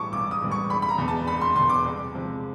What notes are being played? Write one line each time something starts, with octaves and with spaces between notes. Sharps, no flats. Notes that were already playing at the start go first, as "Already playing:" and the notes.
Already playing: B1 A2 E3 G3 A5 C#6 D6
B1 D6
D#6
A2 E3 G3
C#6
E1 B5
B5
A#5
E2 B2
A5
E1 B5
C6
E2 B2 C6
D6
C2
C3 F3 G#3